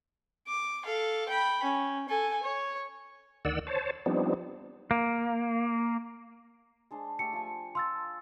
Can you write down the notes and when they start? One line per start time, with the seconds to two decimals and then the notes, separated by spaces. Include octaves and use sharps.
0.47 D6
0.85 A4 F5
1.28 G5 B5
1.63 C#4
2.08 A4 G#5
2.43 C#5
3.45 D2 D#3 D5 F#5 E6
3.67 C5 C#5 A5
4.06 F3 G3 B3 C4 D4 D#4
4.91 A#3
6.91 G#3 D4 C5
7.19 A3 G4 D5 C#7
7.33 F3 G#5
7.75 F4 C6 E6 A6